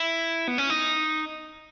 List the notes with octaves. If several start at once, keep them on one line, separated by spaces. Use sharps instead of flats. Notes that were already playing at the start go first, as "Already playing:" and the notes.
Already playing: E4
B3
C#4
D#4